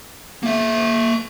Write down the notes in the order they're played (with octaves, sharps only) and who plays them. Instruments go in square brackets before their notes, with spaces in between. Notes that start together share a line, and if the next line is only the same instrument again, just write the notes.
[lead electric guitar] A#3 E5